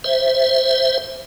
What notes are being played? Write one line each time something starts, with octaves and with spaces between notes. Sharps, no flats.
C5 E5